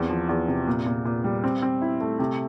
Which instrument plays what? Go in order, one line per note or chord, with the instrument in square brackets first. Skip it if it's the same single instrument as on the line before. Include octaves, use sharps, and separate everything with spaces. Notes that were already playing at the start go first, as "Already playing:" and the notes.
Already playing: [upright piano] E2 C4
F3
E2
C3
A#2
A#2
A#2
G3
C4
C4
E4
A3
C3